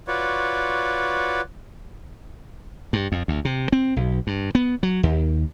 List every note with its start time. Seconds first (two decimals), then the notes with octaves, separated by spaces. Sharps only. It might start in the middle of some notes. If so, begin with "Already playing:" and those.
0.08 F4 F#4 B4 C#5 D5
2.93 G2
3.12 F2
3.28 D2
3.45 C3
3.72 C4
3.96 B1
4.27 G2
4.55 B3
4.83 F#3
5.03 D#2